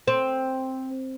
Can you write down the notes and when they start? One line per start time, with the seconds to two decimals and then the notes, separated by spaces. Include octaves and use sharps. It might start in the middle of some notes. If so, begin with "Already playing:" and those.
0.08 C4